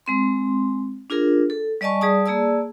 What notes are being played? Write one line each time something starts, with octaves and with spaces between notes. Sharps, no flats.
G#3 C4 C6
D4 F4 G#4 A#4
A4
G3 D5 D#5 G#5 A5 C#6
G3 G#4 D5 A5 D#6
A#3 G#4 D5 A5 E6